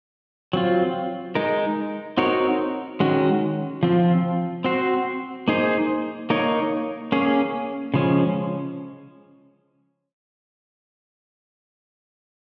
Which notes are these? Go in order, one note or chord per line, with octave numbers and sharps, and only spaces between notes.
F#3 C4 F4
G#3 D#4 A#4
C4 D#4 F#4 A#4 C#5
D#3 G#3 C#4 F#4
F3 C4 F4
C4 F#4 C5
A#3 D#4 G#4 C5
A#3 D#4 A#4 C#5
A#3 C#4 G#4
C#3 F3 G#3 C#4